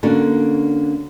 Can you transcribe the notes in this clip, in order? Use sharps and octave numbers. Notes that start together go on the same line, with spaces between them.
D3 A#3 C#4 D4 F#4 A4